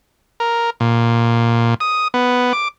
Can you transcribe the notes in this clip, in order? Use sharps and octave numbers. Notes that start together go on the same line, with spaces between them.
A#4
A#2
D#6
B3
D6